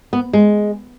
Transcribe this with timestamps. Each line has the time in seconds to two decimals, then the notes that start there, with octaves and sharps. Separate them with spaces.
0.13 B3
0.33 G#3